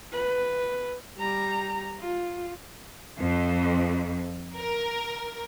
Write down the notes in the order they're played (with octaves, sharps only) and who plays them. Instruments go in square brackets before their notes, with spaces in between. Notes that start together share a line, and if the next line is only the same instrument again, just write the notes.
[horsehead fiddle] B4
[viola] G3 A#5
F4
[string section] F2
A#4